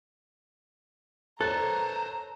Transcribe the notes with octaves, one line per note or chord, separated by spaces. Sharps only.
A4 C5 C#5 A#5 F#6